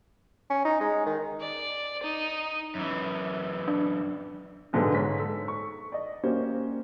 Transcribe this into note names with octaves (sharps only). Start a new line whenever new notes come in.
C#4
D#4
G#3
D#3
D5
D#4
F#2 E3
D4
B1 G#2 D3 G#3 B3
G#2 C#5 B6
A4
C#6
D5 D#5
G3 A#3 C#4 F#4 C5